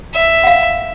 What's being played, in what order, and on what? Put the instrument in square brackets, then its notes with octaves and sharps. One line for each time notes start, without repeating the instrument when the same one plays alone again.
[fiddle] E5
[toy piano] F5 F#5